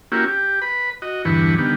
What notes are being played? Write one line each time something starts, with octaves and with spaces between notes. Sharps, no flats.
A#3 C#4 E4 F#4 G4
G4
B4 B5
F#4 D#5
E2 G2 D3 E3 B4 C#6
D3 D#3 G3 B3